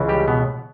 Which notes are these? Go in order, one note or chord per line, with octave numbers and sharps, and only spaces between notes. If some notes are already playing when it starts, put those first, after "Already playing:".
Already playing: C#2 C#3 E3
G3 G4
B2 B3